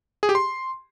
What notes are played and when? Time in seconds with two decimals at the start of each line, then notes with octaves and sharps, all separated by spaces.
0.23 G#4
0.29 G4
0.35 C6